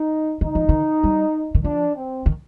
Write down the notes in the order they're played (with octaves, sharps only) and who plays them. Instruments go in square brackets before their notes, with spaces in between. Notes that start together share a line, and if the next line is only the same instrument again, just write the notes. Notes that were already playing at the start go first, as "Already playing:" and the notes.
Already playing: [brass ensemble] D#4
[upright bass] D#3 [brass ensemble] D#4
[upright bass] F3
D#3
G3
D#3
[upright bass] F3 [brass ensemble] D4
[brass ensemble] C4
[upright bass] D#3